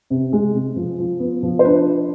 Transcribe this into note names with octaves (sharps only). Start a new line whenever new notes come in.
C3
G#3
C3
F3
F3
B3
F3
C5
D4 B4